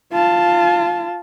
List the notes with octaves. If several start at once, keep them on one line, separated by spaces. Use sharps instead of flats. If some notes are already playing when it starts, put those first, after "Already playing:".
F4 A5